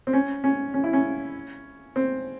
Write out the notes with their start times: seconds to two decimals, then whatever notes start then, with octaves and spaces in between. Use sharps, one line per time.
0.07 C4
0.13 C#4
0.44 C#4
0.74 C#4
0.84 E4
0.93 C#4
1.96 C4